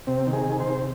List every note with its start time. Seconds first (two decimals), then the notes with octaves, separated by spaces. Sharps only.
0.07 C3 C4
0.27 D#3
0.33 G#4
0.46 C3
0.60 C5
0.67 C3